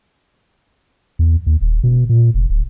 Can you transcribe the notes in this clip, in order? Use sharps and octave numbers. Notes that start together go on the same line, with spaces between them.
E2
D#2
D#1
B2
A#2
F1
D1